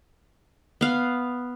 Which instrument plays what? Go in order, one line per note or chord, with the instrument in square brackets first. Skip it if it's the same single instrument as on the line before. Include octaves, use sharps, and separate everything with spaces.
[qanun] B3 F5